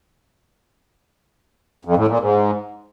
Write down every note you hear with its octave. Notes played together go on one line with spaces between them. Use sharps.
F2
A2
A#2
G#2